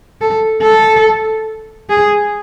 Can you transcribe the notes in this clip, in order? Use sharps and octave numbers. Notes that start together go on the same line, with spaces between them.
A4
A4
G#4